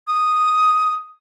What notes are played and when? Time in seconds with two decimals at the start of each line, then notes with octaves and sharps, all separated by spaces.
0.07 D#6